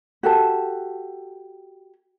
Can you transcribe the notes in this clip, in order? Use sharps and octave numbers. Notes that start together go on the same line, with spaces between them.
F#4 G4 A4 A5